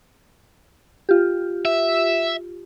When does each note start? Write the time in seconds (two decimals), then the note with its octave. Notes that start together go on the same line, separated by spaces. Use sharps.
1.09 F4 G4
1.65 E5